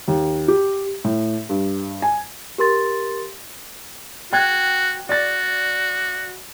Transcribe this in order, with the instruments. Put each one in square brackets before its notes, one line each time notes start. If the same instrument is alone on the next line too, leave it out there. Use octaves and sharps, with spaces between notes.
[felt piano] D#2
G4
A2
G2
G#5
[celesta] G4 A#4 C6 A6
[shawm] F#4 [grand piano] G5 F#6 G#6
[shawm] F#4 [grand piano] D5 A6